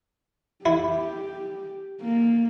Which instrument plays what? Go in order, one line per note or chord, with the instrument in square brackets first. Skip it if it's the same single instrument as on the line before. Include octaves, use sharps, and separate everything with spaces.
[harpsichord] E4 [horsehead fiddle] G4
[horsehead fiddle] A#3